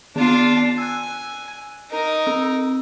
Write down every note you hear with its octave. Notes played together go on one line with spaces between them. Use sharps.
D#3 B3 D4 F4
G#5 E6 F#6
D#4 A#4
C4 E6